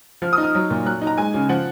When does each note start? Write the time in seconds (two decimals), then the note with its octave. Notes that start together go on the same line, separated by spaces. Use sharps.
0.22 F3 F6
0.33 D#6
0.38 D#4
0.43 F6
0.55 F#3
0.70 A#2
0.85 F#3 F#6
1.01 D#4
1.07 A#5
1.18 G#3 G#5
1.34 C#3
1.49 F3 F#5